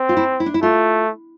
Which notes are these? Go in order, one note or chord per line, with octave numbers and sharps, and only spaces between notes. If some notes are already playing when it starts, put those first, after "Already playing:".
Already playing: C4
F4
E4
E4
D4
E4
A3 F4